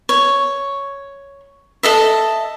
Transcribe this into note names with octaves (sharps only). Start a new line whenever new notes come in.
C#5
A4 D#5 E5